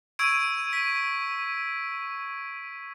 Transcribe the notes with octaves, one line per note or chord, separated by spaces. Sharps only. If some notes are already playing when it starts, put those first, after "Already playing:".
C#6 E6 G#6 D7 D#7
B6